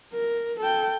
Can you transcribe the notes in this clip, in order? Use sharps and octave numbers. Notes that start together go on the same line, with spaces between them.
A#4
A4 G5